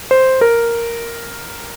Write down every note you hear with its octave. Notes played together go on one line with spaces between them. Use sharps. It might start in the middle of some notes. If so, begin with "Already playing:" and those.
C5
A#4